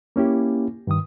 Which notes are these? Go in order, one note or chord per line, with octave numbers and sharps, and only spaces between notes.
A#3 C#4 E4 G4
G2 D#3 D#6